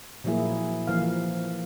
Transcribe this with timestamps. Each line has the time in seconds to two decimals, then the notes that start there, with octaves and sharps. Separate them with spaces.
0.24 A#2 F3 F#3 A#3 E4 G#4
0.87 E3 F3 A#3 F5